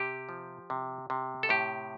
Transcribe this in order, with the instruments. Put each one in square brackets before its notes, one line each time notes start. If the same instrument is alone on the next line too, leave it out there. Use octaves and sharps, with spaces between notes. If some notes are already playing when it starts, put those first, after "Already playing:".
Already playing: [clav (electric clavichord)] C3 G4
F3
C3
C3
A4
A2 G4